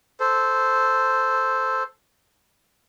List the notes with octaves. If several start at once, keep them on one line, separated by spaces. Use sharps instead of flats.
A4 C5